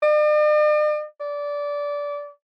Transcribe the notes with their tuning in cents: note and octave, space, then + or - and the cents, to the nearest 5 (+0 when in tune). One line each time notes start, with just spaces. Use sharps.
D5 +45
D5 -20